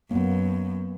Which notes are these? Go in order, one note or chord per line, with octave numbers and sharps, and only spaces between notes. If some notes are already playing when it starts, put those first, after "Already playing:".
F#2 A#3 B3